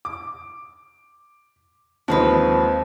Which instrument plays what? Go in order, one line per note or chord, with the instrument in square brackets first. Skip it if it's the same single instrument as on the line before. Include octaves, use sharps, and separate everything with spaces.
[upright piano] D6
[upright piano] D#2 C4 [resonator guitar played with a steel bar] F3 G#3 B4